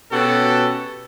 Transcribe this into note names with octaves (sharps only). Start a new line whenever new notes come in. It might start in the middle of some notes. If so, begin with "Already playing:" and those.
B2 C#4 F#4 G4 A4